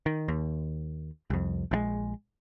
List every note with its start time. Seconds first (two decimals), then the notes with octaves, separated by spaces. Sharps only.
0.06 D#3
0.28 D#2
1.30 C2 F2
1.71 A#1 E3 G#3